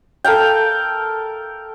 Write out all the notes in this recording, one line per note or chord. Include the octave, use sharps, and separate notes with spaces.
A4 A#4 F5 G5